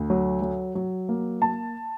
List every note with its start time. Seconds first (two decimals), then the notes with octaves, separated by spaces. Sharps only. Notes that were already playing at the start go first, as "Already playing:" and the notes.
Already playing: D2
0.10 F#3
0.42 F#3
0.75 F#3
1.09 A#3
1.42 A#3 A5